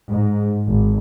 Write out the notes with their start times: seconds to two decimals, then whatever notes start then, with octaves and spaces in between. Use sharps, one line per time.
0.11 G#2
0.68 G#1